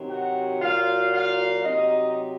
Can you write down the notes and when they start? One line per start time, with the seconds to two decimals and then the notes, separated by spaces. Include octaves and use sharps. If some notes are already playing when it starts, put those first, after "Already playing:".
Already playing: C3 D#3 F#3
0.09 F#4 F#5
0.61 A#2 F#3 F4 F5
1.13 F4 F5
1.64 C3 F#3 D#4 D#5